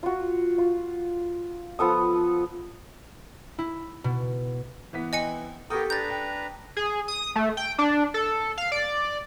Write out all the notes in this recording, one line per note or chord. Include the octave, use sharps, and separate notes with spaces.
F4 F#4
F4
F3 B3 A4 D#6
E4
B2
E3 B3 B6
C4 E4 D#5 G#5 C#7
B3 G4 A4 A#4 G5 C#6 D#6
D4 B4 A#5 G6 A6
G5
G#4
D#6
A3
G5
D4
A4
F5
D5